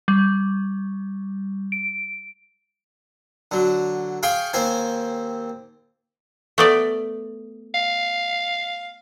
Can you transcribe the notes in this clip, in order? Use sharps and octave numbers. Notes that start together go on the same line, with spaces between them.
G3
D7
D3 F#3
G#4 F5 G5 G#5 C6 C#6
D#2 C4 C5 G#5
A3 B3 D5
F5